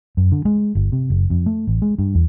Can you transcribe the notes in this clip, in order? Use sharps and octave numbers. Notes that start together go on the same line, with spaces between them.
F#2
D3
G#3
G1
C3
F#1
F2
A3
A1
G#3
G2
E2